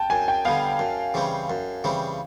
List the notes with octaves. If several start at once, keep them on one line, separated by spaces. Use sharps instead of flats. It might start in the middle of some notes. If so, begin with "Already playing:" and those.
Already playing: G5 A5
F#2 G#5
G5
D3 G3 B3 F5
F#2
C#3 E3 G3 C4
F#2
C#3 E3 G3 C4